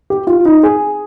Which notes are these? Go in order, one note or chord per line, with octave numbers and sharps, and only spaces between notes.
G4
F4
D#4
G#4